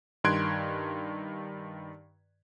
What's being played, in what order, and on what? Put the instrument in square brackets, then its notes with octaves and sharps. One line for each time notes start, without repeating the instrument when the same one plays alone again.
[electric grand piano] G2 D#3 C6 F#6 G#6 D7